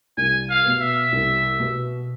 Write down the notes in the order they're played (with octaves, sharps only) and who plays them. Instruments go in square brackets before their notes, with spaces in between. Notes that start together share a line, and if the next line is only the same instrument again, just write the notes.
[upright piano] C2 [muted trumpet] G#5
[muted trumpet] F5
[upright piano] B2 B3
[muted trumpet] E5
[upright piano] C2
B2 B3